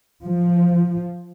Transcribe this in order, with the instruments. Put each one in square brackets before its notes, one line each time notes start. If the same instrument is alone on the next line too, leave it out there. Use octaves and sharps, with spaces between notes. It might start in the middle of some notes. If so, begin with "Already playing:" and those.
[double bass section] F3